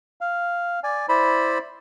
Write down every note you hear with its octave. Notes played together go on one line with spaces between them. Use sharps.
F5
D5 G#5
E4 C5 D5 B5